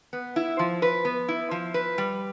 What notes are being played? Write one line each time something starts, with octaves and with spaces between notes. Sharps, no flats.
B3
E4
F3
B4
B3
E4
F3
B4
G3